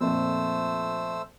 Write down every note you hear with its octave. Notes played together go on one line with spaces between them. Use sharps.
F2 A#2 A3 C5 E6